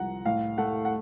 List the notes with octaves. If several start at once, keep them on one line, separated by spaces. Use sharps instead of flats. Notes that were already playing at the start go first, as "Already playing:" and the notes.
Already playing: C2 F3 F#5 A#5
A2 F5
A3 F#5
F#5